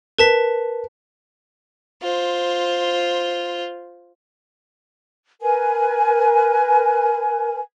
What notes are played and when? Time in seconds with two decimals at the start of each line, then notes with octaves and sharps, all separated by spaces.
0.18 A#4 B4 A5 B6
2.02 F4 C5
5.41 A#4 B4 G#5